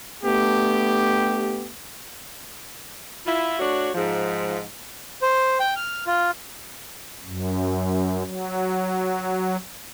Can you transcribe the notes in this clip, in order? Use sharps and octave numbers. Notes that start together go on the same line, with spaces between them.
A3 B3 D4 G4
E4 F4
A3 D4 F#4 C#5
G#2 F3
C5
G5
F6
F4
F#2
F#3